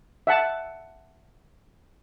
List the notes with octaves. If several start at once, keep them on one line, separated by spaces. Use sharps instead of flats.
E5 F#5 A5